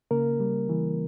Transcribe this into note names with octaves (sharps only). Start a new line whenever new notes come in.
C#3 A#3 A#4
G3
E3